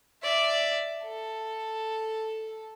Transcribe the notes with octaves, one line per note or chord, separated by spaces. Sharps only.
D5 E5
A4